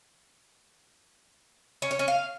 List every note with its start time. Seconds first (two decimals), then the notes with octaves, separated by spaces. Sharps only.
1.82 C#4
1.91 C#5
1.99 C#4
2.08 F5